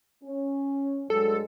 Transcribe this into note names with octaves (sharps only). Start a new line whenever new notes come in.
C#4
G2 F#3 G#3 A4